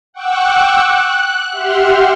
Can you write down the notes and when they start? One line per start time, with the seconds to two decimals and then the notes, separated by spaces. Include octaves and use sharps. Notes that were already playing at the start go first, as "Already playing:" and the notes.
0.13 F#5 G5 C#6 D6 E6 F#6
0.85 F#6
1.51 G4 E5 F#5 C6 F6